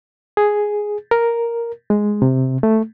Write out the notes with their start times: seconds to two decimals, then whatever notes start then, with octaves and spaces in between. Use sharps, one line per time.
0.37 G#4
1.11 A#4
1.90 G#3
2.22 C3
2.63 A3